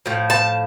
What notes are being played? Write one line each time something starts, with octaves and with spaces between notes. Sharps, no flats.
A2 F3
A5